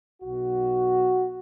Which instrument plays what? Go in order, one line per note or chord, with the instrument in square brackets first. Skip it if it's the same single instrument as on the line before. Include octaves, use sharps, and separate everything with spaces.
[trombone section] B1 B2 F#4